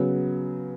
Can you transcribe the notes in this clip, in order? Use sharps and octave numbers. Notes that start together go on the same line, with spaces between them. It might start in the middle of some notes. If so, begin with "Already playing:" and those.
Already playing: C#3 F#3 B3